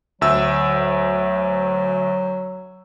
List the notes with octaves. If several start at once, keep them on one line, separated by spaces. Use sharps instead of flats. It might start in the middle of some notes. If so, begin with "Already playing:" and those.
D2 F#3 E5 E6